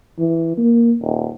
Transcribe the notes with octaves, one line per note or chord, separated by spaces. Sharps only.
E3
A#3
D#1